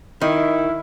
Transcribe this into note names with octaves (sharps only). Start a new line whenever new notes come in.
D#3 E4